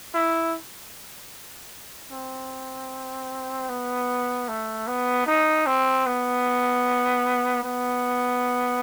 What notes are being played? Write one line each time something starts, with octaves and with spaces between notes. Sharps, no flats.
E4
C4
B3
A3
B3
D#4
C4
B3
B3